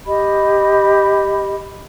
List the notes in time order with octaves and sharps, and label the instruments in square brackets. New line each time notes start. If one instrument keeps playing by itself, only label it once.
[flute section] G4 D#5 B5